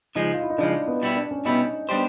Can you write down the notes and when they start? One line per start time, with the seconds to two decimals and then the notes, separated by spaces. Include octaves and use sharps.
0.15 C#3 F3 G#3 D#4
0.34 F4
0.42 E4
0.50 D#4
0.58 C#3 F3 G#3 D4
0.88 B3
1.02 B2 G3 B3 E4
1.16 D4
1.31 C#4
1.45 B2 G3 B3 D#4 E4
1.89 G3 B3 D4 G4 C5